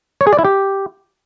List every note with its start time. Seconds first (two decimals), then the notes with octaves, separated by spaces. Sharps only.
0.21 C#5
0.27 G#4
0.33 D5
0.39 E4
0.45 G4